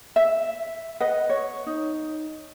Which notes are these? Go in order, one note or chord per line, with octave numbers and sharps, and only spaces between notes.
E5
B4 D#5 F#5
C#5
D#4